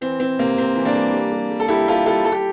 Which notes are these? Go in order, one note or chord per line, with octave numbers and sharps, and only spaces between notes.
E3 C4
E3 C4
C3 A#3
C3 C4
E3
A#3 D4
G3
G3
G3
G3
A4
G3 E4 G4
G3 F4 A4
G3 F4 A4
G3 A4
G4